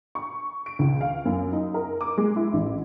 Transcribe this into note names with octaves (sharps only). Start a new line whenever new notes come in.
C#6
D7
C#2
F5
F#2
D#4
A#4
D6
G#3
E4
A1